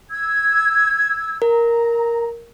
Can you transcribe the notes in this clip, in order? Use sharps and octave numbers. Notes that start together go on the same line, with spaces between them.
E6 G#6
A#4 A#5